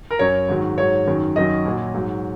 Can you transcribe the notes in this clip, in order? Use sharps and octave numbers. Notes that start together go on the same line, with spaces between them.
A#4
F#2 F#3 C#5
G#2 D#3 F#3
G#2 F#3 C#5
F#2 D#3 F#3
F#2 D#3 F#3 D#5
A#2 F#3
G#2 F#3